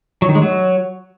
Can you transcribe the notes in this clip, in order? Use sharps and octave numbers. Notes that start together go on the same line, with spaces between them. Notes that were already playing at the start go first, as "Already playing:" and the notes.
F#3
D#3
G#3
F#3